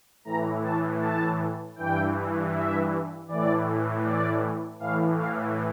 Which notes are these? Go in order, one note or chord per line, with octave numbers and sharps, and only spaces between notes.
A2 E3 A#5
A5
A5
G2 E3 G5
E5
A2 E3 D5
D5
A2 E3 F5
F5